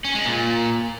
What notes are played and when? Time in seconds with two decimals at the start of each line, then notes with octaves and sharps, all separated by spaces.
0.05 C#4
0.15 G#3
0.25 A#2